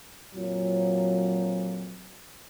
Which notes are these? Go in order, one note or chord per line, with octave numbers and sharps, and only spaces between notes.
F2 A#2 F3 F#3